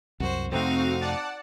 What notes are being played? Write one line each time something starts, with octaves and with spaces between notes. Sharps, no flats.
C2 F#2 F#4 C5
F2 C3 A3 C4 D#4 F#4 F5
D5 F#5 A5